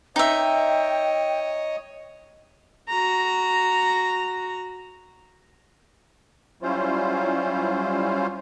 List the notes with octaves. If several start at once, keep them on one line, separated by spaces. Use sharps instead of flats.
D#4 C#5 D#5 E5 G5
F#4 A#5
F#3 G3 C#4 E4 F4 C5